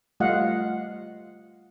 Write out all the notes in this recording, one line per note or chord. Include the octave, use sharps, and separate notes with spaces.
G3 A3 F4 D#5 F5 F#5